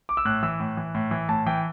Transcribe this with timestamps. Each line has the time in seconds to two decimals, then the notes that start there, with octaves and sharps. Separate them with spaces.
0.09 D6
0.17 E6
0.25 A2 F#6
0.43 E3 E6
0.60 A2
0.77 E3
0.95 A2
1.11 E3
1.29 A2 A5
1.46 E3 G5